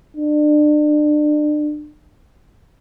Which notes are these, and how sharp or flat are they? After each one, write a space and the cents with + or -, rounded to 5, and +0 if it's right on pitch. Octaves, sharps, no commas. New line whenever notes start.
D4 +35